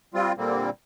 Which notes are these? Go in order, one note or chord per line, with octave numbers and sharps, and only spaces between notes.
G3 C4 F4
A#2 D3 G3 A#3 C4